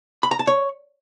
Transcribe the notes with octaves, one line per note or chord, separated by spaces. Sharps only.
B5
A#5
A5
C#5